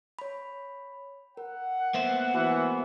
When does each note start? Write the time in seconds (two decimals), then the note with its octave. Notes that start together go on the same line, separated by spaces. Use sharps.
0.19 C#5 B5
1.37 A#4 F#5
1.94 A#3 B3 C5 E5
2.34 E3 F#4